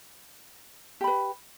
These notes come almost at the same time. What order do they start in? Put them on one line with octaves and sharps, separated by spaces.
G4 B5 B4